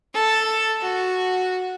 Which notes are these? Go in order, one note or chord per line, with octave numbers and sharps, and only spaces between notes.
A4
F#4